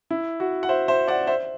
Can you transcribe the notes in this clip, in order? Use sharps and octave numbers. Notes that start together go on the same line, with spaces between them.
E4
F#4
F#5
C5 E5
C5 E5
D5 F#5
C5 E5